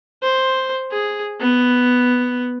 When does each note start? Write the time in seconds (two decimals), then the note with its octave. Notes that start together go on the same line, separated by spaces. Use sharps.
0.23 C5
0.91 G#4
1.40 B3